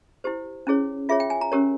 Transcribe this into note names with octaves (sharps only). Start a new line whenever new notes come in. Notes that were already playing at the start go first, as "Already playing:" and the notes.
E4 G4 C5
C#4 E4 G#4 C#5
F4 G#4 C#5 E5
G5
G#5
A#5
C#4 G4 A#4 C#5